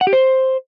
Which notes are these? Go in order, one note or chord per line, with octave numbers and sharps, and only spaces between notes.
F#5
G4
C5